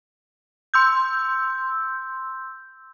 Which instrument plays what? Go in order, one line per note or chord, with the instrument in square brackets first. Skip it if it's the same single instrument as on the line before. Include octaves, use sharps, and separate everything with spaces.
[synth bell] C6 E6 G6